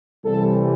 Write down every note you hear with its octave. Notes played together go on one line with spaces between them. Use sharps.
C2 C3 E3 G3 C4 A4